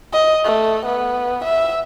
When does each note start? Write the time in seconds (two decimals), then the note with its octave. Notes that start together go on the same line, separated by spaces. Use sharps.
0.13 D#5
0.45 A3
0.86 B3
1.44 E5